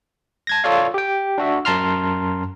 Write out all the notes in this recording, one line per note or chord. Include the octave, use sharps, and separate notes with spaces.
A5 G#6 A#6
F4 A4 C#5 D5 F5
G4 G5
D4 F#4 E5
F#2 A5 A#5 C6 F6